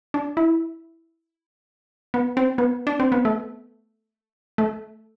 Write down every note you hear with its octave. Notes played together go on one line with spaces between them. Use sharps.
D4
E4
B3
C4
B3
D4
C4
B3
A3
A3